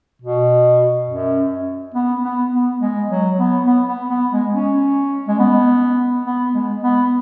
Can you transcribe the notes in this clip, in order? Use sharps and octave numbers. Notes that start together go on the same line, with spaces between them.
B2
F#2
B3
B3
B3
G#3
F#3
B3
B3
B3
B3
G#3
C#4
G#3
B3
B3
G#3
B3